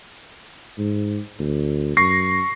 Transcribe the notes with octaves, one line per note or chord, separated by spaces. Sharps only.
G#2
D2
F#2 C#6 A#6 C7